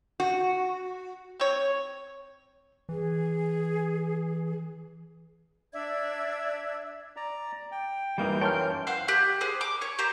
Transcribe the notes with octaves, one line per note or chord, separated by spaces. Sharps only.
F#4
C4 C#5
E3 G#4
D4 D5 E5 G#6
D5 A#5
G5
F#2 E3 G3 A#3 D#4 G6
A#4 C#5 G5 A5 C6 F6
C5 F5 F#5
G4 F#6
G#4 C5
D6
C#5
G4 C5 A#5